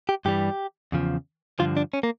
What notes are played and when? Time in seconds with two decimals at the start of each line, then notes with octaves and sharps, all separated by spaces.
0.09 G4
0.25 G2 E3 G3 G4
0.92 E2 C#3 F3
1.59 G2 D3 F3 F4
1.77 D4
1.93 C#4
2.03 A#3